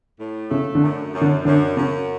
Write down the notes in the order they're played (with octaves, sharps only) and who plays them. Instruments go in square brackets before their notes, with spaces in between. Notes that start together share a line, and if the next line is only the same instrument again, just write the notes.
[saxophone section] A2
[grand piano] C#3 C#4 [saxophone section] A3
[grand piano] D3 D4
[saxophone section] F#2
F#2
[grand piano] D3 D4
[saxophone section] F#2 [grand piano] D3 D4
[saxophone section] F#2 [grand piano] C#3 C#4